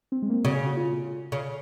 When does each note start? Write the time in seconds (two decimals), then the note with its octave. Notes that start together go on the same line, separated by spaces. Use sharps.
0.12 C4
0.22 G#3
0.30 A#3
0.33 C4
0.45 C#3 F#4
0.55 G#4
0.67 F#4
0.77 F4
1.32 C#3